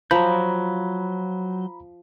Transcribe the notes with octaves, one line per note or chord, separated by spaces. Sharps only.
F3 F#3 A#5 B5 G6